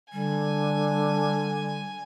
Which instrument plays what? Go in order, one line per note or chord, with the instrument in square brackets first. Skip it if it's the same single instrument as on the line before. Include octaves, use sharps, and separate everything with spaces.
[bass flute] D3 [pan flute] G3 [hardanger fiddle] G#5